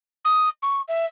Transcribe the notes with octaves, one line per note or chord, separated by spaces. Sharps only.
D#6
C#6
E5